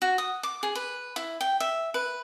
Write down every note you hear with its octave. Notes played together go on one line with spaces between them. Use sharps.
F#4
D#6
D6
G#4
B4
E4
G5
E5
B4